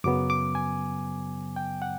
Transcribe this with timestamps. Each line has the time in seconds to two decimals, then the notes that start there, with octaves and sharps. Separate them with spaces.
0.04 F#2 C#3 F#3 B3 D6
0.30 D6
0.55 G#5
1.56 G5
1.82 F#5